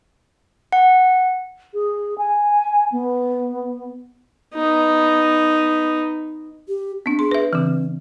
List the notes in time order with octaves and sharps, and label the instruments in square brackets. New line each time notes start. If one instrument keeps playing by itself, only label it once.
[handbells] F#5
[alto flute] G#4
G#5
B3
[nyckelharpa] B3 D#4
[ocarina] G4
[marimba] B3 D4 [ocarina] C4
[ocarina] G#4 [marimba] C6
[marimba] B4 E5
[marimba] C#3 E3 [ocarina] C4